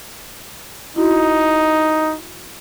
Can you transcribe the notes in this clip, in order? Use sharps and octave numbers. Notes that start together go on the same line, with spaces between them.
D#4 E4 F#4